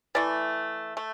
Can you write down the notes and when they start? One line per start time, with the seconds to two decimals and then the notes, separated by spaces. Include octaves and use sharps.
0.15 E3 A3 D5
0.97 A3